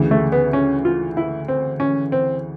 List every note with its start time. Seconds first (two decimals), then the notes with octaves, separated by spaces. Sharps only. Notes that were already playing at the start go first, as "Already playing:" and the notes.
Already playing: D2 C#3 E3
0.11 A3
0.32 B3
0.53 C#4
0.85 F4
1.17 E4
1.48 C4
1.80 C#4
2.12 C4